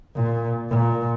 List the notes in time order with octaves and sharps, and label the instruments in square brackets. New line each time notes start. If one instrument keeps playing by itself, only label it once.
[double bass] A#2
A#2